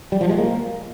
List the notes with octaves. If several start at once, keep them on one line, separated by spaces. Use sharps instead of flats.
G3
F3
G#3
A#3